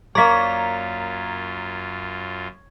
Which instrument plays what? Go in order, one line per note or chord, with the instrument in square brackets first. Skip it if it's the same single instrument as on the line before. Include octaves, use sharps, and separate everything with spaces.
[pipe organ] F#2 F4 [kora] A#3 D5 [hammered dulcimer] C#5 [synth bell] A#5 B6